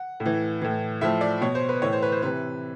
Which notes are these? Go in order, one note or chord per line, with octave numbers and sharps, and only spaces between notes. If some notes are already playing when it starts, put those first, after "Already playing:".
Already playing: F#5
A2
E3
A2 E3
A2 F3 E5
D5
B2 C#5
C5
B4
A2 E3 C#5
C5
B4
C5
C3 E3 B4